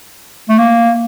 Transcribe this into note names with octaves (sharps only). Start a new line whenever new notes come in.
A3
A#3